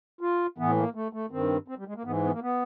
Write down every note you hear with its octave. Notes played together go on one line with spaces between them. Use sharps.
F4
A2 E3 B3
A#3
A3
A3
G2 D#3 C4
C4
G3
G#3
A#3
G#2 E3 B3
B3
A#3
B3